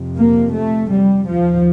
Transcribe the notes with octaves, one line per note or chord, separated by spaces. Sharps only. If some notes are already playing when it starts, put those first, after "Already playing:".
Already playing: F2 C3
A#3
A3
G3
D#2 F3